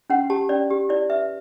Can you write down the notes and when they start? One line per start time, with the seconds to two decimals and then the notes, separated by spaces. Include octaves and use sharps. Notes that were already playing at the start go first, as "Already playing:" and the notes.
0.10 C#4 F#5
0.30 G4 A5
0.49 C#4 D5
0.70 G4
0.89 E4 D5
1.09 B4 E5